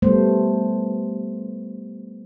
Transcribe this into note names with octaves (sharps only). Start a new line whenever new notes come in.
G3 A3 B3 C5